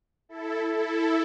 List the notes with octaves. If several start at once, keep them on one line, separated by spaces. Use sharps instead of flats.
E4 A4
E4 A4